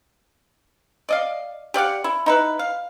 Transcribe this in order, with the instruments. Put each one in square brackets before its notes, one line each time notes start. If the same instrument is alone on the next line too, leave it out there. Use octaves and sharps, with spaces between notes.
[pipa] D5 D#5 F5
G4 D5 F5 F#5
E4
D#4 E4 B4
F5